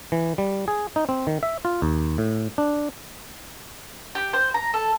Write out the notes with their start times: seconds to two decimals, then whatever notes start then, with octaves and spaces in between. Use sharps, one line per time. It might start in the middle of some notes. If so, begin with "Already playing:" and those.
0.12 E3
0.38 G3
0.68 G#4
0.96 D#4
1.09 C4
1.27 D#3
1.43 E5
1.65 F4
1.82 D#2
2.18 A2
2.58 D4
4.15 G4
4.33 C5
4.54 A#5
4.74 A4